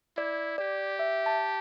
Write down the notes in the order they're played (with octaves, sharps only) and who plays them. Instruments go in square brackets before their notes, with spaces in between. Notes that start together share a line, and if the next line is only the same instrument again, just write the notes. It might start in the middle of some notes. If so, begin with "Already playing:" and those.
[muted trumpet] E4 [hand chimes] D5
[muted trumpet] G4 [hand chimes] D5
[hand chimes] E5
A5